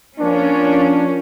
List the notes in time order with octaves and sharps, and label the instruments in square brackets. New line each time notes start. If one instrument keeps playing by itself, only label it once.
[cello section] F3 C#4 [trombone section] A#3 D4